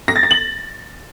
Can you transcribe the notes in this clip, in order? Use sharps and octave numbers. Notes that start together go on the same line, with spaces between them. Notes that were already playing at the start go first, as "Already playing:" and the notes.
A#6
A6
A#6
F#7